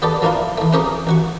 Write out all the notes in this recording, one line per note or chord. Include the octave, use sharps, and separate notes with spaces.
B3 G4 A4 D5
F3 A#3 D4 E4 F4
E3 A3
C4 C#4 G4 G#4 A#4 C#5
A1 F#4 C#6